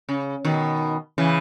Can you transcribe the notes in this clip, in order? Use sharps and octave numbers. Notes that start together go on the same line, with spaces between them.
C#3
B2 D#3
C#3 E3